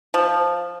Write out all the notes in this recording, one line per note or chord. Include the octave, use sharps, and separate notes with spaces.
F3